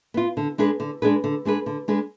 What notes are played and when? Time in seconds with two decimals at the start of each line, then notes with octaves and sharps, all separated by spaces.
0.14 B3 F4
0.37 D3
0.58 G#3 D4 G#4 B4
0.80 D3
1.02 G#3 D4 G#4 B4
1.24 D3
1.45 G#3 D4 G#4 B4
1.66 D3
1.88 G#3 D4 G#4 B4